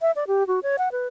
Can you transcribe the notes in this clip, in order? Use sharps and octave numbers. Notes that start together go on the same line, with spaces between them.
E5
D5
G4
F#4
C#5
F#5
B4